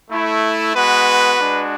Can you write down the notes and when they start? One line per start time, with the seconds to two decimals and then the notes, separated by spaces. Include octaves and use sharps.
0.10 A3 E4
0.75 G#3 B3 F#4 B4
1.38 G#3 D4 F#4